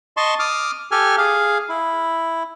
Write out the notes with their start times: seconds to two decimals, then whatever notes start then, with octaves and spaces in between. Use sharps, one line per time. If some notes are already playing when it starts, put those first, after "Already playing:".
0.17 D#5 A5 C6 C#6
0.39 D6 D#6 F6
0.91 G4 A4 G#5 F6
1.18 G#4 F5
1.69 E4